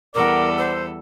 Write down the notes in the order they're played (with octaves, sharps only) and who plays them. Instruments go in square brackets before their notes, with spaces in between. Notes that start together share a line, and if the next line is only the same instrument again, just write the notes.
[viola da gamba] E2 G3 A4 [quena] A#4 [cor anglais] D5 [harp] F#5 C#6 D6
[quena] C5 [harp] E6